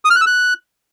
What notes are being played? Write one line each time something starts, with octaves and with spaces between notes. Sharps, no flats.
D#6
F6
F#6
E6
F#6